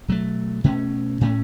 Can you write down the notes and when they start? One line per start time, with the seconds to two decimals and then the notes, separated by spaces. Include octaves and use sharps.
0.08 B2 F#3 A3
0.64 B2 A3 C#4
1.21 A2 A3 C#4